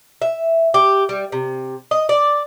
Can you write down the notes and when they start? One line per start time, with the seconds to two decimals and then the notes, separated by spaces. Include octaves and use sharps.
0.22 E5
0.74 G4
1.09 G3
1.32 C3
1.91 D#5
2.09 D5